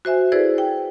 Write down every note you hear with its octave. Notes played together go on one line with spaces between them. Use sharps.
F#4 C5 E5 G#5
E4 G#4 A4 B4 C5 D5
G5